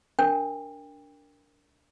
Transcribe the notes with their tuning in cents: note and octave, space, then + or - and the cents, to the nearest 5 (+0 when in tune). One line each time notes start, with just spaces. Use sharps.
D4 -15 A#4 +0 G5 +30